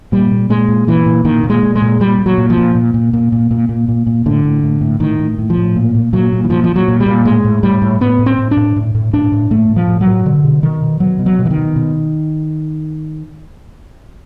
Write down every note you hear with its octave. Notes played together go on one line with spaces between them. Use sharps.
A#2 G3
A#2
A#2 G#3
A#2
A#2 E3
A#2
A#2 D#3
A#2
G#3
A#2
G#3
A#2
A#2 G3
A#2
F#3
A#2
F3
A#2
A#2
A#2
A#2
A#2
A#2
A#2
A#2
A#2
A2 D3
A2
A2
A2
A2 D#3
A2
A2
F3
A2
A#2
A#2
A#2 F#3
A#2
E3
A#2 F3
F3
A#2
F#3
A#2
G3
A#2
A2 G#3
A2
A2 G3
A2
A2 B3
A2
C4
A2
D4
A2
A2
A2
A2 D4
A2
A2 A3
A2
F3
A2
F#3
A2
B2 D3
B2
B2 D#3
B2
B2 F#3
B2
F#3
B2
E3
D#3
B2
B2